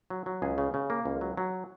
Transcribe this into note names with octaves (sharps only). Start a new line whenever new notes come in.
F#3
F#3
C#2 G#4
C#3
C#3
A#3
C#2
F#3
F#3